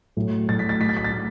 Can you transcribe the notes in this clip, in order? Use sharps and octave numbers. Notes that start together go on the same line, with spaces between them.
A2 F#3
A2 F#3 A6
B6
A6
A2 F#3 B6
A6
B6
A6
A2